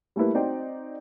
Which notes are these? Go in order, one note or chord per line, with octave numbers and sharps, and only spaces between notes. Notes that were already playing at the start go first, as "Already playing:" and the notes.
G3 A3 A#3 E4 B4
C4 D#4 F#4 C5 D5 G5